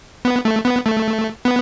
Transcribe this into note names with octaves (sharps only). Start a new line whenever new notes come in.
B3
A3
B3
A3
B3